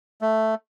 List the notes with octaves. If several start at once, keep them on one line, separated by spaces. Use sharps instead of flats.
A3